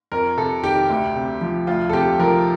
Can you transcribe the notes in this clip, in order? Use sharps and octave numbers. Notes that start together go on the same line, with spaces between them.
F2 A#4
C3 A4
D#3 G4
D2
C3
F3
D2 F4
A4
C3 G4
F3 A#4